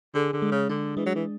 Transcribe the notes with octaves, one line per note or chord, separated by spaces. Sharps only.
D3 G#4
D3
G#3
C#3
D3 D4
E3 G#3
F#3
E3